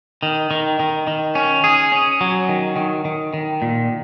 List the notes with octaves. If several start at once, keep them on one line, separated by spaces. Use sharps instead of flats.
D#3
D#3
D#3
D#3
C#4
G#4
C#4
F#3
D#3
D#3
D#3
D#3
A#2